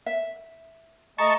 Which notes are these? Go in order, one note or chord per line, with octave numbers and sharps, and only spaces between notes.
E5
A3 D#5 A5 A#5 C#6